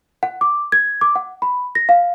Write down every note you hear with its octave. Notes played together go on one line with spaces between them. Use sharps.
F#5
D6
G#6
D6
F#5
B5
A#6
F5